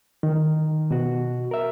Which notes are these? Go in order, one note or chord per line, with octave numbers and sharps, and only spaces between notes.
D#3
B2 F#4
A#4 E5